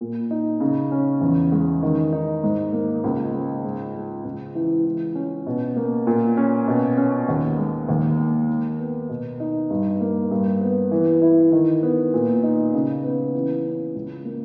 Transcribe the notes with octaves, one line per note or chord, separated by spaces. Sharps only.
A#2
D#4
C#3
C#4
E2
G#3
D#3
D#4
G#2
A#3
C#2
G#3
G#2
G#3
C#2
E3
E3
C#4
B2
A#3
A#2
C#4
B2
C#4
D#2
G#3
D#2
A#3
D#3
B3
B2
D#4
G2
A#3
G2
B3
E3
E4
D#3
B3
A#2
D#4
C#3
B3
E3
C#4
C#2
A#3